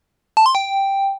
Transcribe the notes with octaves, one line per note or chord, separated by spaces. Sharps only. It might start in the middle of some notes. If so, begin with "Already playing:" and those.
A5
C6
G5